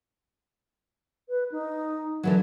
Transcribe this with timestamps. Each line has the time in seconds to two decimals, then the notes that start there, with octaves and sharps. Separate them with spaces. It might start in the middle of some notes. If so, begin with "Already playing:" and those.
1.29 B4
1.52 D#4
2.23 D3 E3 F#3